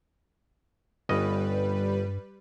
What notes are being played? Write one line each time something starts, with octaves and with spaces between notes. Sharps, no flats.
G1 G2 G3 C#4 B4 D#5